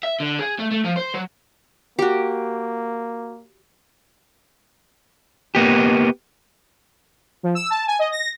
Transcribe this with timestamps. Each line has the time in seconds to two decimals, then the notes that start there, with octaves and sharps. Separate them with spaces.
0.03 E5
0.20 D3
0.39 G#4
0.59 A3
0.71 A3
0.84 F3
0.96 C5
1.14 F#3
1.99 A#3 F#4 G4
5.55 A#3 B3 G4
7.43 F3
7.55 E6
7.70 A5
7.87 G#5
7.99 D#5
8.12 A#6